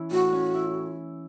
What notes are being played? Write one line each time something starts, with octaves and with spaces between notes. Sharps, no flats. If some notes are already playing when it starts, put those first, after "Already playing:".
Already playing: E3 C#4 E4
A2 F#4
C#4
E4